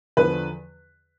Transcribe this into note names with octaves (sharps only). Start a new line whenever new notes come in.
E2 D3 F3 B4